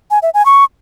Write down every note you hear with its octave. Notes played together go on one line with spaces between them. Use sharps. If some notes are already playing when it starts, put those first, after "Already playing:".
G#5
E5
G#5
C#6